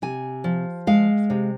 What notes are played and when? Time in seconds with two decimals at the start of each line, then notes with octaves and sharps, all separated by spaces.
0.02 C3 G#5
0.44 F3
0.87 G#3 F5
1.30 C3